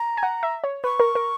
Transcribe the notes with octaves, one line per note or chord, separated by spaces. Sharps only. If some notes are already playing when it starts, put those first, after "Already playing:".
Already playing: A#5
G#5
F#5
E5
C#5
B4 C#6
A#4
A#4